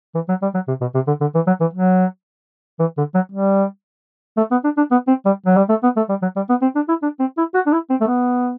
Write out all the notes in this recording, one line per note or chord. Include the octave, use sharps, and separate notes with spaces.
E3
F#3
G3
F#3
C3
B2
C3
D3
D3
E3
F#3
E3
F#3
E3
D3
F#3
G3
A3
B3
D4
D4
B3
C4
G3
F#3
G3
A3
B3
A3
G3
F#3
G3
B3
C4
D4
E4
D4
C4
E4
F#4
D4
E4
C4
A3
B3